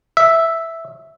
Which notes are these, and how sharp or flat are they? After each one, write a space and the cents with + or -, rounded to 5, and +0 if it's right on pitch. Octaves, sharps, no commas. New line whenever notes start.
E5 +0